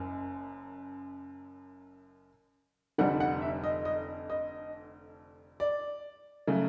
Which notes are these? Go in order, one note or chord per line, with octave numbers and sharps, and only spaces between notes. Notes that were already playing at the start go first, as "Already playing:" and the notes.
Already playing: F#1 F#2
F1 F2 D3 G3 F#5
F#5
E5
D#5
D#5
D#5
D5
C#3 F#3 A3